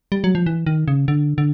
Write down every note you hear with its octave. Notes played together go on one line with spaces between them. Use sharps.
G3
F#3
F3
E3
D#3
C#3
D3
D3